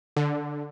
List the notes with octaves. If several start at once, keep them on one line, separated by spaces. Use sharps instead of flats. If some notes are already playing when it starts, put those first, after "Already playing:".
D3